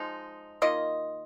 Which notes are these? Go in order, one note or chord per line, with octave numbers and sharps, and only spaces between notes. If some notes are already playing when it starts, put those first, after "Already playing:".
Already playing: F3 G#3 D#4
D#3 A#3 F4 D#5